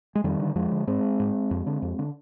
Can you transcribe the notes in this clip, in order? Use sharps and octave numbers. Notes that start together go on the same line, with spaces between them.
G#3
F2 D#3 G3
D3
F2 F3 G#3
D3
G#2 G#3 C4
G#2
F2
D3
F2
D3